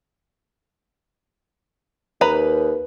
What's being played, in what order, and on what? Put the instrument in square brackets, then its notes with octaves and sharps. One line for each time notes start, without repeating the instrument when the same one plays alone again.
[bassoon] D#2 [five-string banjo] B4 A#5